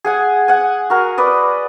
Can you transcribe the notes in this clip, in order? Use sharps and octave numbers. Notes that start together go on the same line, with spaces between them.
G#4 F#5 G#5
F#5 G#5
F#4 A#4
B4 D5 D#5